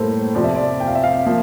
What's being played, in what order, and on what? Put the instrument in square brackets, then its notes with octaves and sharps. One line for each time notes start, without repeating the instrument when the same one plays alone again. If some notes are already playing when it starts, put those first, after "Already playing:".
Already playing: [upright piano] A2 G3 A#3 A4 C5
C3 F3 C4 D5
E5
D5
G5
F5
E5
F5
F3 A#3